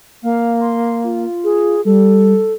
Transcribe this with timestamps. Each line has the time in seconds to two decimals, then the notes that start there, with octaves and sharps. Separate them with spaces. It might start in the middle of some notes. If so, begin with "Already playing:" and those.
0.23 A#3 F5
0.61 C6
1.04 F4
1.44 G#4
1.85 G3 A4